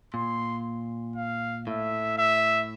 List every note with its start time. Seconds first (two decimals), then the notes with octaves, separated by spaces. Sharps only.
0.14 A#2 C6
1.16 F5
1.67 A2 E5
2.18 E5